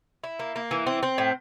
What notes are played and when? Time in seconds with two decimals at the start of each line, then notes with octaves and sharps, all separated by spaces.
0.24 E4
0.39 A#3
0.56 A#3
0.71 E3
0.87 C4
1.03 C4
1.18 A2